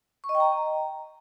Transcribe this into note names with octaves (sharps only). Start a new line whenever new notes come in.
C#6
D#5
G5
A#5